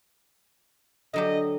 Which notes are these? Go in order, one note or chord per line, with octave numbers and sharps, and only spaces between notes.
D3 F#3 G4 D#5